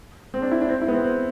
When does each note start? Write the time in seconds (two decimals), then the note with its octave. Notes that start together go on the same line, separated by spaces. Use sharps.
0.34 C4
0.42 D4
0.51 E4
0.61 D4
0.69 C4
0.81 E4
0.88 B3
0.93 C4
1.04 C4